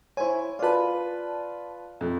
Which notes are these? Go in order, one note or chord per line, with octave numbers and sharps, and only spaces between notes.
E4 C5 C#5 G#5
F4 B4 D5 A5
F2